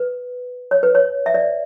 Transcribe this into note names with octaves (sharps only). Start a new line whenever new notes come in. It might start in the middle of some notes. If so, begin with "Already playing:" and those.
Already playing: B4
C#5
B4
C#5
E5
D5